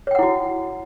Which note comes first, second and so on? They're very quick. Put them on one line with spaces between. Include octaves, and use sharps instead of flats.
C#5 G5 F#5 E4 F#4